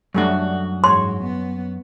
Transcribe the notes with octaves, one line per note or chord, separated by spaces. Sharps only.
F#2 G3 A3 D4 F#4
G#2 C#5 C6
B3